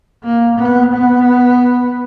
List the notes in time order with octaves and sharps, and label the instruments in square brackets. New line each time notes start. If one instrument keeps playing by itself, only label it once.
[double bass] A#3
B3
B3